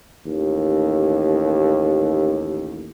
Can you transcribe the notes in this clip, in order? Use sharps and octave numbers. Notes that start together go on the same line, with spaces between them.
A1 D#2